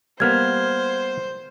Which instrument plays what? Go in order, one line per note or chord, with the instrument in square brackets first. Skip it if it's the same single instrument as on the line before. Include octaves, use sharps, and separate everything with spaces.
[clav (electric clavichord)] G3 A#3 B3 [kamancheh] C5 [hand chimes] F6 G#6